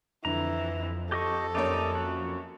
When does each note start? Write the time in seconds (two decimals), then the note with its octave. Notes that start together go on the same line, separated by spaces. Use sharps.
0.25 F2 D3 E3 A#5
1.12 G4 A4 D#5 C#6
1.55 F#2 A#3 D#4 G4 C#5 D5
1.95 F#4